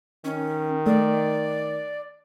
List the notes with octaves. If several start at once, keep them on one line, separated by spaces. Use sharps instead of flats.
D#3 C#4
A3 D5